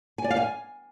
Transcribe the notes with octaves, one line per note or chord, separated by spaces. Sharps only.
G#5
D5
F5
G#5